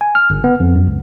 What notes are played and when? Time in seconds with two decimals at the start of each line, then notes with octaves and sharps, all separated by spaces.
0.01 G#5
0.15 F6
0.30 G1
0.44 B3
0.60 F2
0.75 F#2
0.87 C#2